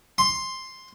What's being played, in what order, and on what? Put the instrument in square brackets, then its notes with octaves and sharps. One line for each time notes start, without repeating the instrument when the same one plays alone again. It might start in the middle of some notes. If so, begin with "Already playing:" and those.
[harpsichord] C6